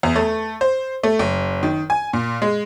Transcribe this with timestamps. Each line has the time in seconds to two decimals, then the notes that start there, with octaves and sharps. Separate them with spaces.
0.03 E2
0.16 A3
0.61 C5
1.03 A3
1.19 F#1
1.63 D#3
1.90 G#5
2.13 A#2
2.42 G#3